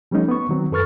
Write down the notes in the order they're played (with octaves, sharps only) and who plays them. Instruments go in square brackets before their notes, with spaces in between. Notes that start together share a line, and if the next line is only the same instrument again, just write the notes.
[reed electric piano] F3 G3 A3 C#4 D#4
B3 C#6
D#3 F#3 C4
F#2 A4 B4 C#6 F6 A6